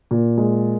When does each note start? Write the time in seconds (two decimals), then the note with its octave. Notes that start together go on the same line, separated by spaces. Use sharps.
0.11 A#2
0.38 G#3